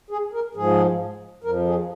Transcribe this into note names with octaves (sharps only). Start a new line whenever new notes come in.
G#4
A#4
G#2 F3 G#4
F2 F3 A#4
G#4